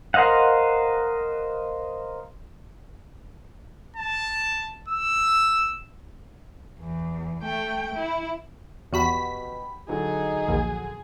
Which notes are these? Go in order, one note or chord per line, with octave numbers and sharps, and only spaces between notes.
A#4 C5 D#5 F5 F#5
A5
E6
E2
A3 G5
E4
E2 B2 F#4 G4 B5 B6
D3 F#3 D#4 G#4
A#1 D#2